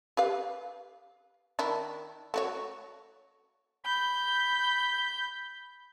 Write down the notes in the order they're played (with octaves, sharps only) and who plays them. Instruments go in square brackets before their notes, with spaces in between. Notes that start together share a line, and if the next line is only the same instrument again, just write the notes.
[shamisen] G4 B4 F5
D#3 D4 E4
A3 F#4 C#5
[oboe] B5 [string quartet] G6